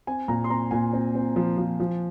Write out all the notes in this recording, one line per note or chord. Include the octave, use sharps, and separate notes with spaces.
C4 G#5
A#2 A#5
C6
C4 A#5
A#2 G#5
C4
C4
F3
F3
F3